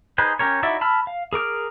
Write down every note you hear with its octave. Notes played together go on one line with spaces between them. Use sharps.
D#4 G#4 B4 C5
C#4 G4 A#4 C#5
D#4 E4 F#4 D5 E5
A5 B5 E6 F6
F5
G#4 A#4 D6 F6